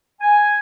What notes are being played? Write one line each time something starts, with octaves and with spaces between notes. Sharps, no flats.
G#5